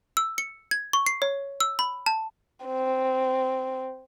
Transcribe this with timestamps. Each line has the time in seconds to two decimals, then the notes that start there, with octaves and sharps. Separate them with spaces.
0.17 E6
0.38 C#7
0.71 G#6
0.93 C#6
1.06 C7
1.22 C#5
1.60 E6
1.79 B5
2.06 A5
2.66 C4